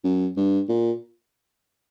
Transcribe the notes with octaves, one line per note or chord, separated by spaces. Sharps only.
F#2
G2
A#2